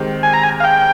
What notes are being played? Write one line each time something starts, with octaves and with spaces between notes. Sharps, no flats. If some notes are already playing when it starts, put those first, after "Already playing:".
Already playing: D#3 G#3 C4 G4
G#5
A#5
G#5
F5
G5